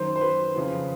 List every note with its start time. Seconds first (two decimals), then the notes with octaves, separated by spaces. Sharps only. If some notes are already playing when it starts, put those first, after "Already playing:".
Already playing: F#2 D#3 C5
0.16 C5
0.21 B4
0.56 F2 C#3 F3